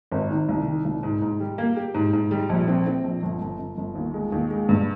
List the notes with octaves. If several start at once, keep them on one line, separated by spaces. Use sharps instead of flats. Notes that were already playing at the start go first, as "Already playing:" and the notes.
G#1
D#3
C2
D#3
C2
G#2
G#2
G3
A#3
G4
G#2
G#2
G3
A#1
C4
C4
A#1
G1
G1
G1
G1
D#2
G#3
D#2
G#3
G2